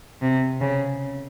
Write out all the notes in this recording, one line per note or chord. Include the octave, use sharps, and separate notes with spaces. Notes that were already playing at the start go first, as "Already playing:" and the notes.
C3
C#3